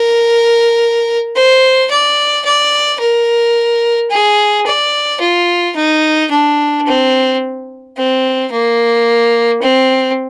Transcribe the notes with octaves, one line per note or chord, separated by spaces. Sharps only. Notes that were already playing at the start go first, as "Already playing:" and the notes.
Already playing: A#4
C5
D5
D5
A#4
G#4
D5
F4
D#4
D4
C4
C4
A#3
C4